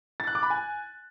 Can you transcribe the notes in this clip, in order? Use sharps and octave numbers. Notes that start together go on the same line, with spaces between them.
A6
F#6
D6
B5
G#5